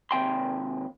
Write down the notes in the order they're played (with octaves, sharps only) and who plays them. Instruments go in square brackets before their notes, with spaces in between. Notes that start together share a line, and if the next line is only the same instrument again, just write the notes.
[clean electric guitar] D#2 C3 G5 C6